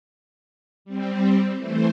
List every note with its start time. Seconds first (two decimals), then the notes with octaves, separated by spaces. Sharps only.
0.85 G3 C4
1.56 E3 A3 C5